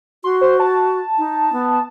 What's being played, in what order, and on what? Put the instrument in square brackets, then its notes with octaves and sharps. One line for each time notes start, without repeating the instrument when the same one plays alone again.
[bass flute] F#4 [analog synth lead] C6
[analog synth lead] C5
A5
[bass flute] D#4
B3